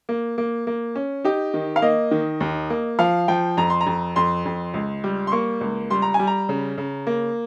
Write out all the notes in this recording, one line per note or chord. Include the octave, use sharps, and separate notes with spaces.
A#3
A#3
A#3
C#4
D#4 G4
D#3
F5
A#3 D#5
D#3
D#2
A#3
F3 F5
F3 G5
F2 A#5
C6
A#5
F2
F2 C6
F2
C#2
G3
C6
A#3 C#6
C#2
G3 C6
A#5
G#5
G3
A#5
C#3
C#3
A#3